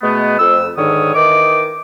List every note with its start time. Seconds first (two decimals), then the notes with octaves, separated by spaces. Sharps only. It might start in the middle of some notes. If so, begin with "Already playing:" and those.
0.02 B2 G#3 A3 B3
0.38 F2 E6
0.77 G#2 D3 D#3 C#5 D#6
1.15 D#3 E3 D#5 D6